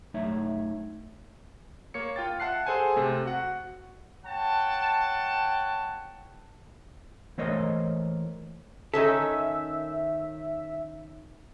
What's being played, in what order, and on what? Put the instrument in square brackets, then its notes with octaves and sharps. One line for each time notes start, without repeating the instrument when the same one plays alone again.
[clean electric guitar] F#2 A3 D#4 C#5 E5
[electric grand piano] A#3 C#5 C#7
F4 G5 A6
E5 F#5 A5 F#6 C7
G#4 A4 C5 F#5 G#5 A5
C3 A3
F#4 F#5
[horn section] C#5 F#5 G5 A5
[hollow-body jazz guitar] E3 A3 A#3 C5 C#5 D#5
[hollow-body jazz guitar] D#3 C#4 A4 [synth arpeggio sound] E5